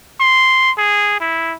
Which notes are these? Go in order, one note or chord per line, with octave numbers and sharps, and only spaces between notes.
C6
G#4
E4